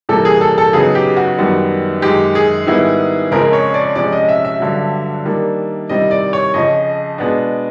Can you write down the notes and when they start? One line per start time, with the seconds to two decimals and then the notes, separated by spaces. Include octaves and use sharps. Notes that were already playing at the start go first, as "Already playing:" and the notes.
0.09 C3 E3 G3 A#3 A4
0.25 G#4
0.41 A4
0.58 A4
0.73 C#3 F#3 B3 D#4 G#4
0.95 G4
1.17 F#4
1.38 F#2 D#3 G3 B3
2.02 F#2 D#3 G#3 G4
2.35 G#4
2.67 G#2 D#3 G3 B3 E4
3.31 F2 C#3 F3 G#3 C4 A#4
3.53 C#5
3.74 D5
3.95 C3 F3 G#3 C#4 D5
4.12 D#5
4.28 E5
4.45 E5
4.60 G2 D3 F#3
5.25 D#3 G3 A#3 D4
5.89 C3 D#3 G3 C4 E4 D#5
6.11 D5
6.33 C#5
6.54 F2 C#3 F3 D#5
7.18 B2 G#3 B3 D4